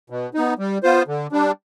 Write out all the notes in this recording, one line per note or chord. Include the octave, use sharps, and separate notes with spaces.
B2
B3 D#4
G3
B3 F4 C5
D3
G3 D4